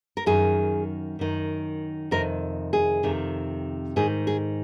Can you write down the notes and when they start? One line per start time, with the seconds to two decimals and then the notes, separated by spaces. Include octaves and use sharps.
0.17 A#4
0.26 F#2 D#3 G#4
1.19 F#2 D#3
2.11 F2 C3 D#3 A#4
2.73 G#4
3.03 F2 C3 D#3
3.96 G#2 D#3 G#4
4.27 G#4